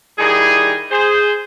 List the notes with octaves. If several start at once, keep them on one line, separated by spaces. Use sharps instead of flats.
D#3 G3 E4 G#4
G#4 C5